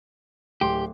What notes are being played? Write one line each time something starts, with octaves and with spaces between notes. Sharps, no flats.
D1 G4 C6